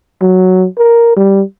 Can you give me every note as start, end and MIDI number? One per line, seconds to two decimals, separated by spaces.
0.22 0.66 54
0.78 1.15 70
1.16 1.42 55